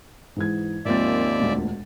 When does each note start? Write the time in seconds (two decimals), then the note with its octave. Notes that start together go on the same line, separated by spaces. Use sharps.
0.36 G#2 E3 G#6
0.85 G#1 D#2 F3 A#3 C4 D5 E5 A6
1.40 E1 D2 A#2